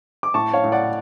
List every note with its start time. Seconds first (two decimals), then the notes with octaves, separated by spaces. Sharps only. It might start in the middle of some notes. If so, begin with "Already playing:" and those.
0.23 D6
0.34 A2 A5 C#6
0.53 C#5 F5
0.63 A2
0.72 D5 F#5